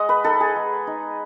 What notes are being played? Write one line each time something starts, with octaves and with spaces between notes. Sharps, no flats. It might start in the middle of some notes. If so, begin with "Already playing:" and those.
Already playing: G#3 D#5 F#5
B4
D#4 A4
G#4
G#3
D#4